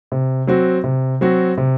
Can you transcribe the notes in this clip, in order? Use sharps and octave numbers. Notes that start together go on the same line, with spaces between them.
C3
F#3 C4 F#4
C3
F#3 C4 F#4
C3